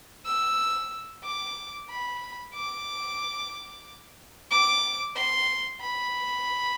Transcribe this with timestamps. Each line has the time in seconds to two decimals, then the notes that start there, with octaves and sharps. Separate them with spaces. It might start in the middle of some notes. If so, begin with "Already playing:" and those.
0.26 E6
1.24 D6
1.89 B5
2.55 D6
4.51 D6
5.16 C6
5.81 B5